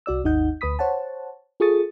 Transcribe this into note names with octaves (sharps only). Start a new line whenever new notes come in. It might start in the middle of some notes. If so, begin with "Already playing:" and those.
C2 F#4 D5 E6
G#1 D#2 D#4 D#5 F#5 G6
D2 B4 B5 D#6 B6
C5 C#5 F#5 A5
F4 G#4 A4 C#6 D#6 A6